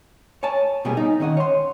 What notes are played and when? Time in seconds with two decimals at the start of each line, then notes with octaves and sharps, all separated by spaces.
0.43 C#5 G#5 A5
0.85 B2 G3 A#3 B3 G#4
0.97 D#4
1.20 D#3 C#4 D#5 F#5
1.37 C#5 C6